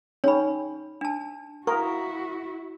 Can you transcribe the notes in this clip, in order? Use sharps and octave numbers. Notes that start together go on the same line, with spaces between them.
C#4 D#4 G#4 C#5 G5 B5
D4 A5
E4 F#4 A#4 F5 C#6 D#6